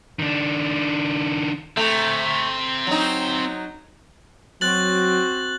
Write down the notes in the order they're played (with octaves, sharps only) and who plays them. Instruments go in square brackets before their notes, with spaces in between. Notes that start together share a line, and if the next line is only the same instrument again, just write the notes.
[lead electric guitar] D#3 D4
[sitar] A3 [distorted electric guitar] C4 A#5
[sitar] F#3 D#4
[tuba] F#3 [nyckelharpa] C4 F#4 [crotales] F#6 A6 F#7